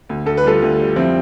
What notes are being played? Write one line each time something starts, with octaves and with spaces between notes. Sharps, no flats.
D2
D2 A4
B4
G3 F4 A4
D2
G3
F2 C4 E4